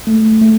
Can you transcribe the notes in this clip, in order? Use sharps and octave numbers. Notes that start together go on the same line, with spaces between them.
A3
A3